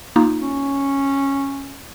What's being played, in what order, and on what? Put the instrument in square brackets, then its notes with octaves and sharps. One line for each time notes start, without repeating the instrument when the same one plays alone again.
[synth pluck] A#3 D#4 F4
[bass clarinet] C#4